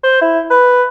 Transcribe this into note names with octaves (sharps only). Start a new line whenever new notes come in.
C5
E4
B4